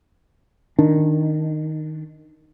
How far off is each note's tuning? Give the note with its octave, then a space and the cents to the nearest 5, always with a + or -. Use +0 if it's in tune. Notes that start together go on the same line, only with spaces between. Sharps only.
D#3 +0 D4 +0